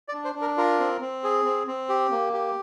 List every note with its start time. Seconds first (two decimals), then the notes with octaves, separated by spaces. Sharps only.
0.09 D5
0.13 D4
0.25 C5
0.35 D4
0.41 A#4
0.57 F4 A#4
0.79 C4
1.01 C4
1.24 G#4
1.45 C4
1.67 C4
1.89 G4
2.11 A#3
2.33 G4